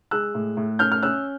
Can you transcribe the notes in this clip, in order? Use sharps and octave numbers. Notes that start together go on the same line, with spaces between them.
G#3 E6 F#6
A2
A2
C#4 F6 G6
F6
C#4 E6 F#6